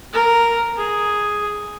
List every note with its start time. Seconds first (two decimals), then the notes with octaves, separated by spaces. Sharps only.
0.13 A#4
0.77 G#4